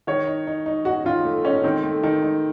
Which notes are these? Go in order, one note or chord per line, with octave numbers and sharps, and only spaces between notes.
D#3 C#5
D#4
D#4
D#4
D#4 F#4
D#3 F4
A3
C#4 D#4
D#3 C4
A3
D#3
D#4